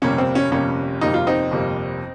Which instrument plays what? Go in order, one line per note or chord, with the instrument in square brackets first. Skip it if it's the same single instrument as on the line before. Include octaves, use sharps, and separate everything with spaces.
[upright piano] G1 F2 C3 G3 A#3 C#4
C4
C#4
G1 F2 C3 G3 A#3 C#4
G1 F2 C3 G3 A#3 D#4
F4
C4 D#4
G1 F2 C3 G3 A#3